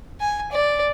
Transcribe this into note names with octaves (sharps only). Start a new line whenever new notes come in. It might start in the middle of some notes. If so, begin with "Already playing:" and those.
G#5
D5